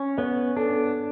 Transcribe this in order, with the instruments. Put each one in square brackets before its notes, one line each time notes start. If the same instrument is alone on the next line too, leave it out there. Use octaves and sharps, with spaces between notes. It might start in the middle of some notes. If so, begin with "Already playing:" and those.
Already playing: [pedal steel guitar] C#4
[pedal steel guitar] B3 [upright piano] C#5
[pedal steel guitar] D4 [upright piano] A4